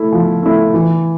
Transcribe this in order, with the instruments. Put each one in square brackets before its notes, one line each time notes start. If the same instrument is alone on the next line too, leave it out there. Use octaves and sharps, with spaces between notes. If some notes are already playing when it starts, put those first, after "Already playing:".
Already playing: [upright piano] A3 E4
F3
A3 E4
E3